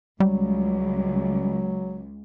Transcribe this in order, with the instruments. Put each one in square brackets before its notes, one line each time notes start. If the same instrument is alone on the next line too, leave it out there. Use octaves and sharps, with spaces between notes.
[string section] C#2 [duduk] F#3 [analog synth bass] G3